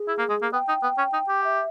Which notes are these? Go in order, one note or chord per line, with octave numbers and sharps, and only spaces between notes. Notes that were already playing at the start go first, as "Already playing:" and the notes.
Already playing: G#4
E4
A#3
G#3
A#3
B3 G5
D#4
B3
C#4
D#4
G4
E5